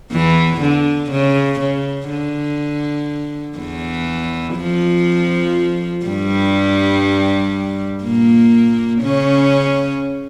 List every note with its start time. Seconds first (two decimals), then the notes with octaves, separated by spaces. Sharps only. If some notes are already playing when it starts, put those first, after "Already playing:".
0.12 E2 E3
0.61 D3
1.11 C#3
1.60 C#3
2.10 D3
3.58 E2 E3
4.57 F2 F3
6.05 G2 G3
8.04 A#2 A#3
9.02 C#3 C#4